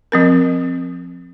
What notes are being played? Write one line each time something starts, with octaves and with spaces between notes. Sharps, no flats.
F3 C4 A#4